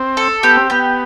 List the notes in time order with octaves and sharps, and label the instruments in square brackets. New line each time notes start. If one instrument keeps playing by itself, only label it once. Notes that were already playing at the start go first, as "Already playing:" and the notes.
Already playing: [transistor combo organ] C4
[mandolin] A4
[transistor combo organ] B3 [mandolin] G4
[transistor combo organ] C4
[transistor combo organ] B3 [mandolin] G4